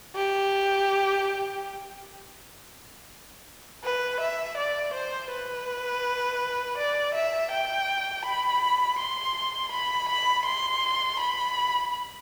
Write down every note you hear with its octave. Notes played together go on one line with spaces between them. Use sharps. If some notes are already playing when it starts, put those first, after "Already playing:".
G4
B4
E5
D5
C5
B4
D5
E5
G5
B5
C6
B5
B5
C6
B5